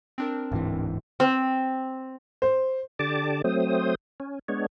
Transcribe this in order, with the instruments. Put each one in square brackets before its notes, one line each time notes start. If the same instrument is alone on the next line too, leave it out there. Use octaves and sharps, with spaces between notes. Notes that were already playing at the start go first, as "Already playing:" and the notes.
[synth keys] C4 D4 A#4
[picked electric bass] D1 G#2 E3
[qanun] C4
[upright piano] C5
[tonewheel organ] D3 G4 D5 A5 D6
F#3 A3 C4 C5 D#6
C#4
G#3 B3 D4 C#5